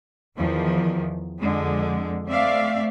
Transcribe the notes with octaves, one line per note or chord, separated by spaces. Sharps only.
E2 D#3 F3
F2 D3 G#3
A3 C4 D5 E5 F5